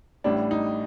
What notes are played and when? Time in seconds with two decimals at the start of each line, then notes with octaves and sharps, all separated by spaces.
0.24 A1 A2 G3 D4
0.51 D#4